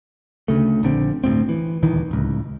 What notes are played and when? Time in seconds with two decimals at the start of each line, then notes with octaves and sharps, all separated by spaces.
0.48 D2 C#3 A3
0.83 A#1 D3 C4
1.24 G1 D2 A2 C4
1.49 E3
1.83 D#1 D2 D#3 E3
2.11 D1 C#2